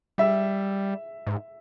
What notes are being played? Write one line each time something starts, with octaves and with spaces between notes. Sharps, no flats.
G3 E5
G#2